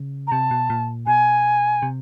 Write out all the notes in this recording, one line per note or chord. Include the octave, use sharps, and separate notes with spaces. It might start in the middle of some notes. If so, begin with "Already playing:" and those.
Already playing: C#3
A#5
C3 A5
B2
A#2
B2 G#5
C3